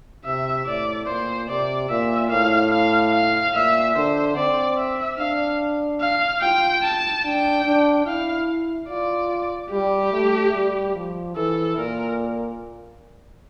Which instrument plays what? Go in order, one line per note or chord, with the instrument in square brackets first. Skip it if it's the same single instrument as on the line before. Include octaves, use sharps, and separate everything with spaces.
[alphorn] C3 [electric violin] E5
[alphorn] A2 [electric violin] D5
[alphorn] A#2 [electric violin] C5
[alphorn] C3 [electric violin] D5
[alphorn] A#2 [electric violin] E5
[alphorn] A2 [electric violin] F5
[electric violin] F5
F5
[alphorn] A#2 [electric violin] E5
[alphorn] D3 [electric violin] C5
[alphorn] C4 [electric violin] D5
[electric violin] E5
[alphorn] D4 [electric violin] F5
[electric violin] F5
[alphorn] F4 [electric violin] G5
[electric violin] A5
[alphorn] D4 [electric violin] G5
[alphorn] D4
[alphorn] E4 [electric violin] F5
[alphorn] F4 [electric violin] D5
[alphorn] G3 [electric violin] G4
[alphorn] A3
G3
F3
[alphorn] E3 [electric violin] A4
[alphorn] A#2 [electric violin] A#4